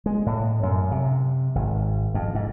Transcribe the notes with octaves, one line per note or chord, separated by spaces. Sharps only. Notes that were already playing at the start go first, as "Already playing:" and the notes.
G#3
A2
F#2
C3
G#1
F2
G#2